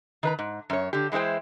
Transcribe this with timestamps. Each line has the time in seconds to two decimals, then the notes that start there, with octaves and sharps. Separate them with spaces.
0.23 D#3 B4 A#5
0.39 G#2
0.70 F#2 C#5
0.93 D3 G4
1.12 E3 G#3 E4 C5 G5